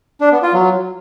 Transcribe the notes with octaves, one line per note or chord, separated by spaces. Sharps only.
D4
B3
F4
F#3